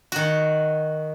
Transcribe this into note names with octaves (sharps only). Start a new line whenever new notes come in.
D#3 F#4